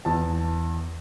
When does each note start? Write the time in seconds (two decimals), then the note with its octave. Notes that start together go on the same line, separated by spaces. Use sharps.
0.05 E2 A5